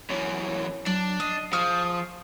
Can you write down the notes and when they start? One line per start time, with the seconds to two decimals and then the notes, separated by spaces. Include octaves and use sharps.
0.10 F#2 E3 C#5
0.86 F#3 D4 D5
1.20 D#5 C7
1.53 F3 G#4 C#6 F6